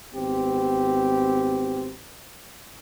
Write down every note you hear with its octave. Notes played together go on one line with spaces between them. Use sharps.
G#1 B3 C4 G4